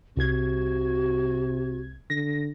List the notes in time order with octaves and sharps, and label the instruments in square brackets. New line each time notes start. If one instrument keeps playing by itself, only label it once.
[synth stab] C2 G#6 [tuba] C3 [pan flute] F#4
[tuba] D3 [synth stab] A#6